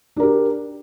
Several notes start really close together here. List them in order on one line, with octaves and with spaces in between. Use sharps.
D4 A#4 G4